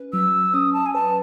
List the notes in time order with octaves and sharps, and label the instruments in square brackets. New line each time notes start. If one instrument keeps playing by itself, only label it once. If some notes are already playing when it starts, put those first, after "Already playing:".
Already playing: [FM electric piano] C#4 B4
[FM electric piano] F#3 [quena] E6
[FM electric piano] C#4 [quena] D#6
[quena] A5
G#5
[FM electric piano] B4 [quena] A5